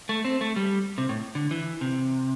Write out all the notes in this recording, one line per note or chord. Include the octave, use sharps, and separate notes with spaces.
A3
C4
A3
G3
C3
A2
D3
E3
C3